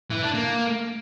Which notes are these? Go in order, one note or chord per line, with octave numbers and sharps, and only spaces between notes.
E3
D4
A#3